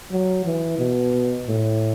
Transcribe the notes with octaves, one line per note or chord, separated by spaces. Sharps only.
F#3
E3
B2
A2